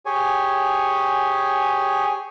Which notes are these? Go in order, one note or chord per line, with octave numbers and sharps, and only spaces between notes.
G4 G#4 C#5 G#5